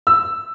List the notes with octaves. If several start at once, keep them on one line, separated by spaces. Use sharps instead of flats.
E6